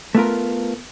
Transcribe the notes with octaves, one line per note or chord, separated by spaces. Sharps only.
A3 B3 F4 A#4